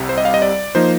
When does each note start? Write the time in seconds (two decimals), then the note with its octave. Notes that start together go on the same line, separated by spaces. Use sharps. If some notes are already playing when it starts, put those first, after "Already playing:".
Already playing: C2 C3 G3
0.09 C5
0.18 D#5
0.25 F5
0.34 D#5
0.42 D5
0.75 F3 A#3 D#4 C5